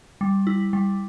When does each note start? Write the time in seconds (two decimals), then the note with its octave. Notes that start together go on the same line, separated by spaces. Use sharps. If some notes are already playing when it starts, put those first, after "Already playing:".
0.21 G3
0.47 E4
0.73 G3